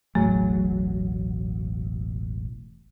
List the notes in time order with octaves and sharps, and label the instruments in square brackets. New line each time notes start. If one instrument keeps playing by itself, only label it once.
[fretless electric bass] E1 A1 F#3 [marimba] A2 A3